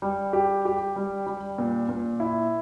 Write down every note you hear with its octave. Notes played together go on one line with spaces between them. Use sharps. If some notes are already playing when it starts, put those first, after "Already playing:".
G3
G4
G4
G3
G3
A#2
A#2
E4